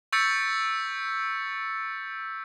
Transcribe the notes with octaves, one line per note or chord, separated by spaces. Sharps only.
C#6 E6 G6 A6 B6 C#7